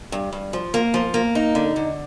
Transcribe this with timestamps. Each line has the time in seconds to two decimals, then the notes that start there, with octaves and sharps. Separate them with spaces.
0.12 G2
0.32 G2
0.53 F3
0.74 A#3
0.94 F3
1.14 A#3
1.35 D#4
1.55 D3
1.76 D3